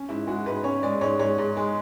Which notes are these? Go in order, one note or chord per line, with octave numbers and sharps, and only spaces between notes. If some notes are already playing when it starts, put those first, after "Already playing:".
Already playing: C#4
G#2 E4
G#3 F#4
G#2 B4
C#4 C#5
G#3 D5
G#2 C#5
G#2 C#5
G#2
G#3